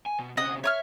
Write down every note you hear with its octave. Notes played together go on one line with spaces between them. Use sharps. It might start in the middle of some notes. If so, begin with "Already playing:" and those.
G#5
B2
C3 C#4 D#5 F#5 D#6
C#5 E5 D#6 F6